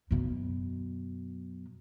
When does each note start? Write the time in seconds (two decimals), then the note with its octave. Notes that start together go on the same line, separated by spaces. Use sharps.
0.11 F#2 B2